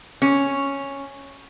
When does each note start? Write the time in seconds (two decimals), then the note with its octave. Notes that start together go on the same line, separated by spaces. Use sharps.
0.22 C#4